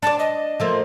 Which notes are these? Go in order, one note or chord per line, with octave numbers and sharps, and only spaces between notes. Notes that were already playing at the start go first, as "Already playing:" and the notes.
D4 D5 A5
D#5
F3 A3 A#3